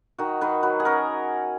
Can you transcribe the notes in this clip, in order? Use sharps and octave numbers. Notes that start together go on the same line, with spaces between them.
D#3 F#4
D#3 B4
F#3 B4
G#4
C#4 A#4